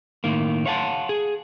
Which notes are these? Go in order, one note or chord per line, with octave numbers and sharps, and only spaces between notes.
A2 D#3 A#3
C#5 F5 F#5 A5
G#4